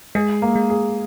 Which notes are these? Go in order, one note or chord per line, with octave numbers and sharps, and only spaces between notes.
G#3 G#4
A#3
G#3
G#4